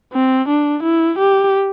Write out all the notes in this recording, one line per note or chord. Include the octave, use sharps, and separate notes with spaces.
C4
D4
E4
G4